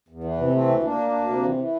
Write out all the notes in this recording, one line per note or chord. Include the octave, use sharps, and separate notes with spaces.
E2
E3
C3
E3 A3 C4
D2
D2 A#3 D4
D2
D2
C3
E3
E3